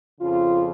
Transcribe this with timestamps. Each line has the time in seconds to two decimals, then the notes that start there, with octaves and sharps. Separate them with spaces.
0.20 F2 C#3 F3 F4